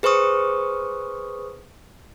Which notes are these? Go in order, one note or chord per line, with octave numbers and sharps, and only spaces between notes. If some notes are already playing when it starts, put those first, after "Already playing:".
G#4 B4 C5 C#6 D#6